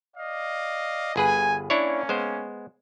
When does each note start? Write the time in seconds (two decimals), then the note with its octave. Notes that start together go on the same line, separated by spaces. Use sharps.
0.17 D5 D#5 F5
1.16 G1 G#4 B4 G#5
1.70 A#3 C#4 D4 E4 C#5
2.09 G#3 B3 C5